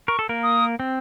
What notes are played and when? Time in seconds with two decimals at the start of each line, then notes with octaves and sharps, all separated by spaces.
0.08 A#4 C#6
0.19 A4
0.29 A#3 A#4
0.43 D#6
0.80 C4